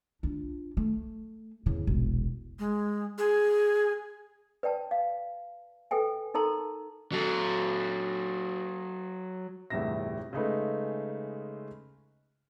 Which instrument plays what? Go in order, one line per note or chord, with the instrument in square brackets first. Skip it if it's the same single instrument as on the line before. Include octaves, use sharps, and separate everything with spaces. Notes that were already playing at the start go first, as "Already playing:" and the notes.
[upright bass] D4 F4
A3
E2 C#3
E1 A#1
[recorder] G#3
G#4
[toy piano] B4 D5 G5 A5
F5
A4 B4 G5 G#5
D#4 A4 A#4 A5 A#5 C6
[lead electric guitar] F#3 A4
[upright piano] G1 E2 A2 C3 E5 A#6
C#3 G#3 A3 D#4 G#4 B4